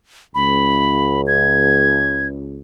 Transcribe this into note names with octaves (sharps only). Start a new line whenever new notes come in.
C#2 B5
G#6